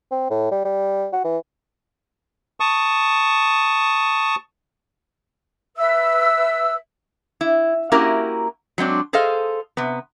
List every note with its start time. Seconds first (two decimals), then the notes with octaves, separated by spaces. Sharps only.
0.11 C4
0.30 A2
0.52 G3
0.65 G3
1.13 F#4
1.24 E3
2.60 A5 C#6 D#6
5.77 B4 E5 E6
7.41 E4
7.92 A#3 C#4 E4 F#4 G4 A#4
8.78 F#3 G#3 C4 D4
9.13 G#4 A4 C5 D#5 F5
9.77 C3 B3